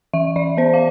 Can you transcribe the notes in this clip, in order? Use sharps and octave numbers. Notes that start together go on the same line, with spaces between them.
E3 E5
E3 D5
B3 C5
F5